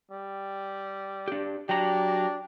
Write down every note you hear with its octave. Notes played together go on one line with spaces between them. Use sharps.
G3
D4 G4
F#3 D4 G4 A#5